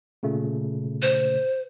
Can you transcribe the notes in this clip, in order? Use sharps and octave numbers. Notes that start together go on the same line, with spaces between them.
A#2 C#3 A3
C5